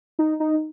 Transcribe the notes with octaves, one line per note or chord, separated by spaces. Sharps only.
D#4
D#4